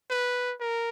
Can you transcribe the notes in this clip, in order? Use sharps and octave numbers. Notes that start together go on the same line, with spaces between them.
B4
A#4